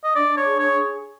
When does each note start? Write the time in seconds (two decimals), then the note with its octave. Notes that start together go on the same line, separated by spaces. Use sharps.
0.04 D#5
0.15 D4 D5
0.37 C#5
0.45 G#4
0.59 C#5